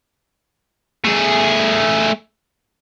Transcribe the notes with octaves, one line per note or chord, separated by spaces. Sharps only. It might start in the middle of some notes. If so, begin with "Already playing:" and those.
A3 G#4